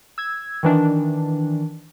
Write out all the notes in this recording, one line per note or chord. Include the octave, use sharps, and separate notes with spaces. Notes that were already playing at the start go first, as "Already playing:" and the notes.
E6 G#6
D#3 E3 D4